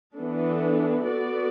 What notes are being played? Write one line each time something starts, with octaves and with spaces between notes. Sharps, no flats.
E3 B3 D4 A4
B3 F#4 A4 D5